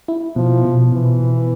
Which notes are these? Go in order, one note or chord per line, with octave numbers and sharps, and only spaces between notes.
E4
B2 F3
B2
B2 E3
B2